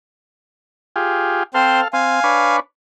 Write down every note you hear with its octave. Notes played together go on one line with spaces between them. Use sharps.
F4 G4 G#4
C4 A4 C5 F5 C6
C4 F5 G#5
D4 B4 C#5